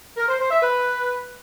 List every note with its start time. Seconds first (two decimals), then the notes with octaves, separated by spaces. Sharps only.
0.17 A#4
0.28 C5
0.40 C5
0.51 E5
0.62 B4